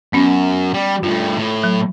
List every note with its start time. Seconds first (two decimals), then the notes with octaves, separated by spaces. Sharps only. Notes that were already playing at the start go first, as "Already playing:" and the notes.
0.13 F#2 B3 C#4
0.74 G3
1.03 G2 A3 F4
1.38 A2
1.64 F#3